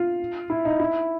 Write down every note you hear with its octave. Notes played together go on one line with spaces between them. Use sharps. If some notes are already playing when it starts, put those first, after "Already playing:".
Already playing: F4
E4
D#4
E4